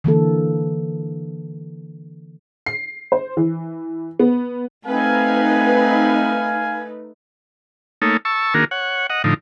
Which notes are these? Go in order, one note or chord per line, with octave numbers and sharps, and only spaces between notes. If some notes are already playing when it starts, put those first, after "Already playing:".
D3 E3 A#3 A4
C7
C5
E3
B3
A3 C4 D#4 B4 F5 G#5
A3 A#3 D#4 A4 C#5
A5 C#6 E6
D#3 A#3 D4 F#4 G#4 A#4
C#5 F#5
D#5 F#5
A2 D3 F3 D#4